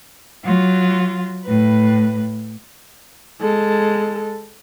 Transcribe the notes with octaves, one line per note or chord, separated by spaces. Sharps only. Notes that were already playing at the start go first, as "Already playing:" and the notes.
F#3 F4
A2 B4
G#3 A4